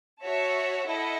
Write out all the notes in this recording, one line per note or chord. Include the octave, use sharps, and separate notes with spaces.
F#4 C#5 E5 A5
E4 A4 D#5 F#5